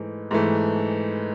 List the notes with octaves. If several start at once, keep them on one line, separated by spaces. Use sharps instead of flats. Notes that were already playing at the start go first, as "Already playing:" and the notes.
Already playing: G#2 E3 A3
G#2 E3 A3